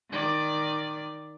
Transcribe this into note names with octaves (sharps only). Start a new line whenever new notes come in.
D#3 D5